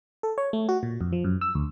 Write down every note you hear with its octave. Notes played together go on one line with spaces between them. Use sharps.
A4
C#5
A3
F#4
A#2
F2
F3
F#2
E6
D2